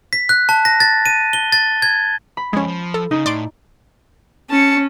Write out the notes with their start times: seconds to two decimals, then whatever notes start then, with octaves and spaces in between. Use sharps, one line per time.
0.13 B6
0.29 F#6
0.49 A5
0.65 A#6
0.80 A6
1.06 D#7
1.33 G7
1.52 A6
1.82 G#6
2.37 B5
2.53 F2 F3 G#3 C#4
2.67 F3
2.94 A4
3.11 C#3 D#4
3.26 A2 D5 C6 D7
4.50 C#4 A5 C#7